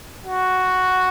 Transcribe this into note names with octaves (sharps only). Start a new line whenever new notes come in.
F#4